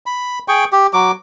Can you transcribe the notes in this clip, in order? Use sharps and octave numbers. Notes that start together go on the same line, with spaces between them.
B5
G#4 G5 C#6
G4
F#3 D6